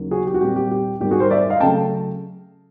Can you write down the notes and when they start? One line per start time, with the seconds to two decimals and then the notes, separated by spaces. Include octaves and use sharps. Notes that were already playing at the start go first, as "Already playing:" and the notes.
Already playing: D#2 C#3 F#3 A#3
0.11 F#4 G#4
0.27 G4
0.34 F#4
0.41 A#2 G3 C4 G4
0.56 G4
0.71 G4
1.00 G#2 D#3 G3 G4
1.11 F#4 G#4
1.20 A#4 C5
1.30 D5 E5
1.50 D#5 F5
1.60 C#3 F#3 A3 G5 A5